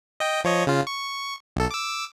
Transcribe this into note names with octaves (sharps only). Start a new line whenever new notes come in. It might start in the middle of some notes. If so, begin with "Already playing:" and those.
D#5 G5
F3 C#5 D#5
C#3 F4
C#6
B1 A4
D6 E6